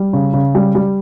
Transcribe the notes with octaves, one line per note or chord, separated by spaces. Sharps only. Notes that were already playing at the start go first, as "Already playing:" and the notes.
Already playing: G3
C#3
C#3
G3
G3